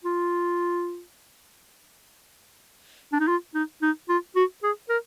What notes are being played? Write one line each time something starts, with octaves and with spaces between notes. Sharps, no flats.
F4
D4
D#4
F4
D#4
D#4
F4
F#4
G#4
A#4